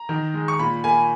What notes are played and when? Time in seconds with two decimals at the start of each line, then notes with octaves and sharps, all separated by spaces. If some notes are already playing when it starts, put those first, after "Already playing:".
Already playing: A#5
0.09 D#3
0.34 G#3
0.48 C#6
0.59 A#2 B5
0.84 A#3 G#5